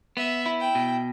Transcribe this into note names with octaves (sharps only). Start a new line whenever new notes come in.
B3 E5
E4
G5
B2